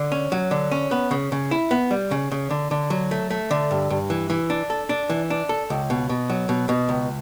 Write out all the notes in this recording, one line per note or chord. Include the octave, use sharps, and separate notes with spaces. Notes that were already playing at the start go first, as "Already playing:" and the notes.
Already playing: D3
C#4
F#3
D3
C#4
B3
C#3
C#3
E4
B3
G3
C#3
C#3
D3
D3
F#3
A3
A3
D3
G2
G2
E3
E3
D4
A4
D4
E3
D4
A4
C#2
B2
B2
F#3
B2
B2
C#2